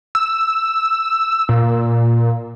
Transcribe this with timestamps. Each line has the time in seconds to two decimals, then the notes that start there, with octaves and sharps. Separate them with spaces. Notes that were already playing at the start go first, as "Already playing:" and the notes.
0.15 E6
1.49 A#2